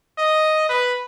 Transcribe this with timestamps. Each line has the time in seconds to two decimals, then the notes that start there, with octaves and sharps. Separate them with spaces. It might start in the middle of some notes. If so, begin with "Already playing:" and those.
0.19 D#5
0.69 B4